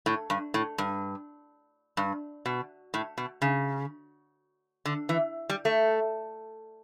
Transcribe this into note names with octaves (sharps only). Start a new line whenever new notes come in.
A2
G2
A2
G2
G2
B2
A2
B2
C#3
D3
E3
G3
A3